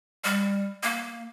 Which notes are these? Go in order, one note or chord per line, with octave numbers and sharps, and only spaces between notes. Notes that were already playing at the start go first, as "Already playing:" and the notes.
G3
A#3